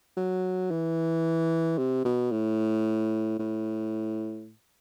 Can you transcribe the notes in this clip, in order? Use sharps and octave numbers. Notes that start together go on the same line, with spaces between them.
F#3
E3
C3
B2
A2
A2